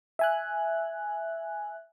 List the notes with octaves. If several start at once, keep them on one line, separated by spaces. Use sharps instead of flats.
E5 G#5 F#6